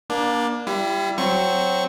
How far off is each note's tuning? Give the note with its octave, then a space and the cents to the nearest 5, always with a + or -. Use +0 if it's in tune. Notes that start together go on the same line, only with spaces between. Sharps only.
A#3 +30 D4 +0
G3 +0 E4 +35
F#3 +10 C4 +0 C#6 +0